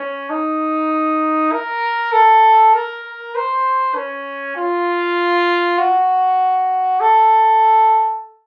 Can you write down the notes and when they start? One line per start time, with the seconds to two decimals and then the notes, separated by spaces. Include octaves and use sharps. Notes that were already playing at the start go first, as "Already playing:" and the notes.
Already playing: C#4
0.30 D#4
1.52 A#4
2.13 A4
2.74 A#4
3.35 C5
3.95 C#4
4.57 F4
5.78 F#4
7.00 A4